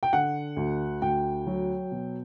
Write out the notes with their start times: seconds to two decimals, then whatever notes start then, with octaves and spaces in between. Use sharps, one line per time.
0.03 G5
0.13 D3 F#5
0.56 D2
1.02 D2 G5
1.47 F#3
1.92 B2